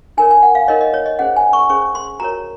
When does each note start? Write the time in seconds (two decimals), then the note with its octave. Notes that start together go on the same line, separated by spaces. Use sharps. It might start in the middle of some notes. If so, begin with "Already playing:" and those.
0.17 D#4 A#4 C#5 G#5
0.31 G#5
0.43 F#5
0.55 F5
0.68 D#4 A#4 C#5 D#5
0.81 D#5
0.94 C#5
1.06 D#5
1.19 C#4 G#4 C5 F#5
1.36 G#5
1.53 C#6
1.69 C#4 G#4 C5 C#6
1.95 C6
2.20 F#4 A#4 C#5 A#5